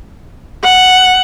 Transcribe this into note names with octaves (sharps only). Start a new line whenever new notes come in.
F#5